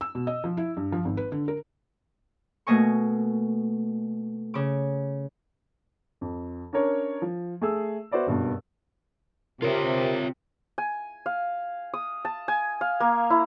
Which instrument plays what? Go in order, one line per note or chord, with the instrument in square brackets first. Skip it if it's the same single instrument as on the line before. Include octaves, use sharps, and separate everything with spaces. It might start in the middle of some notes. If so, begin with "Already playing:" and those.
[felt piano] E6
B2
D#5
F3
E4
G2
F3
G#1
B4
D3
A#4
[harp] B2 A3 A#3 D#5 G#5 C#6
C#3 D6
[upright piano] F2
C#4 D4 A#4 C#5
F3
A3 G#4 E6
B3 F#4 C5 D5 E5
F#1 G2 B2
[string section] C3 [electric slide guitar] F4 C#5 [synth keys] A#4 E5
[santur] G#5
F5
D#6
A5
G#5
F5
A#3
E4